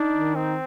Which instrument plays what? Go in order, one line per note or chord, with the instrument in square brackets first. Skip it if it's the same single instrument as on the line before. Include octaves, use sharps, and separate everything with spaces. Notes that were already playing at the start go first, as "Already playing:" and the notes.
Already playing: [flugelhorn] D4 [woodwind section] D#4
[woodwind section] D#3
[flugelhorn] C4 [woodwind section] D#4